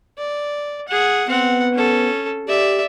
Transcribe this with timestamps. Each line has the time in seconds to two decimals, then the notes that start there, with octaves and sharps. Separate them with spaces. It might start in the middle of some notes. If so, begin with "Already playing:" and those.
0.18 D5
0.88 G#4 F#5
1.28 B3 C4 F#5
1.74 C#4 A4
2.48 G4 D5 E5